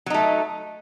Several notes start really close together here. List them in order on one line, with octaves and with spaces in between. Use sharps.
F#3 D#4 A3